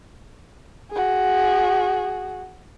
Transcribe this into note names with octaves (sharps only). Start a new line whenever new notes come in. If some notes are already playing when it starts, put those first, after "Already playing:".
F#4 G#4